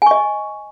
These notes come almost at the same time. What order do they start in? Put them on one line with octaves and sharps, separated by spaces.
G#5 C#6 D#5